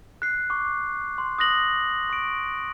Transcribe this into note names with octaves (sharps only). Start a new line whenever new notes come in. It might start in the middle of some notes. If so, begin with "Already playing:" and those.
F#6 C7
C#6 D6
C6
D#6 F#6 A#6 F#7
C#6 D7